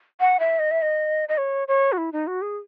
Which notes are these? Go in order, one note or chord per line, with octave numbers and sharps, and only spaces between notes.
F#5
E5
D#5
E5
D#5
D#5
C#5
C#5
F#4
E4
D#4
F#4
G#4